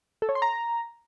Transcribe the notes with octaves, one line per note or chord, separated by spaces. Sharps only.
A4
C#5
C6
A#5